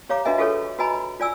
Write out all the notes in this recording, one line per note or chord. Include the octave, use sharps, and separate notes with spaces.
G4 C#5 F5 A#5 D6
D4 F#4 B4 D#5 E5 G#5
F4 F#4 G#4 A4 B4 C#5
F#4 B4 D#5 G#5 A#5 B5
F4 D5 G#5 E6